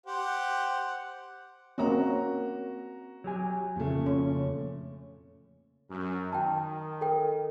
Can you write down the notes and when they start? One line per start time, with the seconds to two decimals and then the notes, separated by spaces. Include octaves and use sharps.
0.06 G4 C5 F#5
1.78 A#3 C4 C#4 F#4 A#5
3.24 F#3 G4 G#5
3.76 F2 A#2 C#3 A3
4.06 C#4
5.90 F#2
6.33 D#3 G5 A5
7.01 A4 A#4 G5